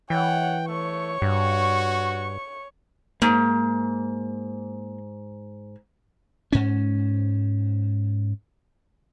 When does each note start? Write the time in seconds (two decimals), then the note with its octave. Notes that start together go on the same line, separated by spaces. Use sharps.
0.10 E3 C#5 F#5 G5
0.68 A3 C#5 C#6
1.22 G2 F#4
3.22 G#2 A#3
6.52 G#2 C#4